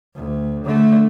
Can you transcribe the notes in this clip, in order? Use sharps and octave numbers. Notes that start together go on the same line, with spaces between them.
D2
D3 A3